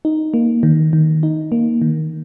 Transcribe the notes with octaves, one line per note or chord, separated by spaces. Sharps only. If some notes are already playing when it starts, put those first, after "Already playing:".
D#4
A#3
D#3
D#3
D#4
A#3
D#3